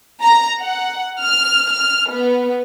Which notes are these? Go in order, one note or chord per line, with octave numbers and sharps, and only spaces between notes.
A#5
F#5
F6
F6
B3